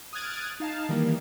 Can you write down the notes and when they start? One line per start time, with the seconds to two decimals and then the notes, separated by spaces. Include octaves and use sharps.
0.13 D#6 F6 F#6 G#6 A6 D7
0.60 D#4 F5 A5
0.89 D#3 E3 G3 A#3